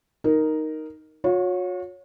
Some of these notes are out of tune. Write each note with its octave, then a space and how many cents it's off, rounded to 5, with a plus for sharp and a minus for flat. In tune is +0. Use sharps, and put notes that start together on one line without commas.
D#4 +0 A#4 +0
F#4 -45 C#5 +0